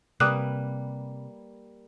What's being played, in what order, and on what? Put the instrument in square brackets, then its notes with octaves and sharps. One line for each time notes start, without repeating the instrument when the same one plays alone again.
[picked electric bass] C3 [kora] G3 A#3 B4 [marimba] D6 D#6 F#6